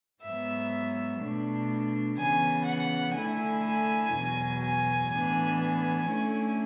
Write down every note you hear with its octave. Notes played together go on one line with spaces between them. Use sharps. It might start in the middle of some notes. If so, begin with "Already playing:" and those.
G#2 F#3 B3 E5
B2 A3 D4
C#3 E3 B3 G#5
F#5
D3 A3 E4 G#5
G#5
E2 B2 F#3
G#5
A2 E3 B3 D4
G#5
D3 A3 C#4 E4